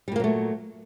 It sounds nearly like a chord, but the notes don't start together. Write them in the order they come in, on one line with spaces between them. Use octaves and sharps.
G3 A#2 A#3 F#3 A3